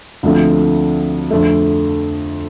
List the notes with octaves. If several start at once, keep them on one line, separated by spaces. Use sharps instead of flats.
D2 D3 F3 A3 C4
F2 D3 A3